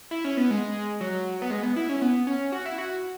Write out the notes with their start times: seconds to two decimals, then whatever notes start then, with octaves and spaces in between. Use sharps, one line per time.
0.11 E4
0.25 C#4
0.37 B3
0.51 G#3
1.01 F#3
1.42 B3
1.51 G#3
1.63 B3
1.76 E4
1.89 C#4
2.02 B3
2.27 C#4
2.52 F#4
2.65 E4
2.78 F#4